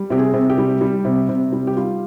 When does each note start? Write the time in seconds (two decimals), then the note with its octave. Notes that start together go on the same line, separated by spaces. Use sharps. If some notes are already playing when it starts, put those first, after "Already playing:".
Already playing: G3
0.10 C3 G4
0.18 G#4
0.34 C3
0.50 G4
0.58 G3
0.81 G3
1.05 C3
1.29 C3
1.52 G3
1.67 G4
1.76 G3 F4